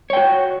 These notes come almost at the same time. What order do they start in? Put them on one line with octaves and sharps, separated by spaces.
C#5 G5 F#4